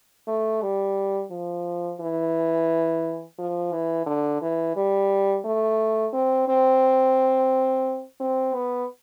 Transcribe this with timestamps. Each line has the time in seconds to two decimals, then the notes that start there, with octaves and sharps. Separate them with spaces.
0.28 A3
0.62 G3
1.31 F3
2.00 E3
3.38 F3
3.72 E3
4.07 D3
4.42 E3
4.76 G3
5.45 A3
6.13 C4
6.48 C4
8.20 C4
8.55 B3